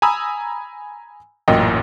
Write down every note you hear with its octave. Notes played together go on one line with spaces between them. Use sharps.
G#5 A#5 B5 D#6 E6
A1 F#2 A#2 D#5 G5